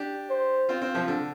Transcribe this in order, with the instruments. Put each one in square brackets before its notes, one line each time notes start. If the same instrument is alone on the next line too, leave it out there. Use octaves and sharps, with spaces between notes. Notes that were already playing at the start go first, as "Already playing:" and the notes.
Already playing: [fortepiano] D4 G4
[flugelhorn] C5
[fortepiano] C4 F4
C4 F4
C3 F3
D3